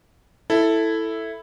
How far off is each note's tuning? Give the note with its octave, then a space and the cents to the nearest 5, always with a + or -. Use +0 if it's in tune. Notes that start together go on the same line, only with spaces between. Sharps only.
E4 +0 A4 +5